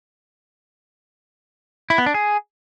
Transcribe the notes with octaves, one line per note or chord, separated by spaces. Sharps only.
E4
B3
D4
G#4